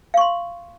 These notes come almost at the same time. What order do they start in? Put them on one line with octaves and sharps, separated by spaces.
F5 C#6 C6